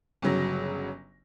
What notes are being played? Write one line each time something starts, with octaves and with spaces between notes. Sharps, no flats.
G1 C#3 F#3 A#6